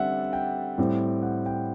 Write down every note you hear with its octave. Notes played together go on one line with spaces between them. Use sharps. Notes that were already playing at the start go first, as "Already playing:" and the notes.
Already playing: D3 G3 C4 D5 E5 F#5
G5
A2 G3 C4
F#5
G5